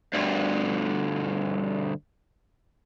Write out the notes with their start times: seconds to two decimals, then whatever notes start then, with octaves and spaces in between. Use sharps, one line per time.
0.14 D2 G2